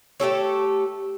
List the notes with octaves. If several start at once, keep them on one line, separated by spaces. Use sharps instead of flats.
A3 G4 A4 C#5